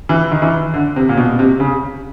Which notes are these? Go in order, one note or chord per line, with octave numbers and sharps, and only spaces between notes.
E3
D#3
E3
D3
C3
A#2
B2
C3
C#3